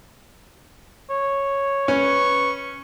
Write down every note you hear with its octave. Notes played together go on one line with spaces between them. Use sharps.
C#5
C#4 B4 C#6